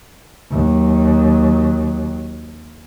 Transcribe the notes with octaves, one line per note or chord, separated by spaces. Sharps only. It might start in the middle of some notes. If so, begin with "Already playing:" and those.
D#2 F#3